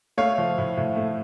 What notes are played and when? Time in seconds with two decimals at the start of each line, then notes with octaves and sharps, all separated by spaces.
0.17 A3 C#5 F5
0.38 F3
0.58 A2
0.77 A2
0.96 A3